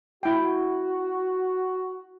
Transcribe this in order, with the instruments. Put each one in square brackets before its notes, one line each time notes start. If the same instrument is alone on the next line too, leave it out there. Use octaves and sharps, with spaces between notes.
[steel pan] E4 G5 [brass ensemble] F#4